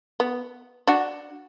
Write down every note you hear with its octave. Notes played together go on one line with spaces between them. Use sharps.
B3
D4 F#4